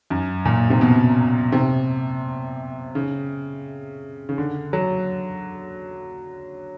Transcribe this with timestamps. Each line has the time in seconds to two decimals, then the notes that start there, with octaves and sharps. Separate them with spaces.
0.10 F#2
0.45 A#2
0.70 C3
0.81 B2
1.52 C3
2.95 C#3
4.29 C#3
4.38 D3
4.73 F#3